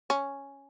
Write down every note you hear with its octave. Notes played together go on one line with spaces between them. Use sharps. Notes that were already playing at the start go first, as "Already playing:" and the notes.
C#4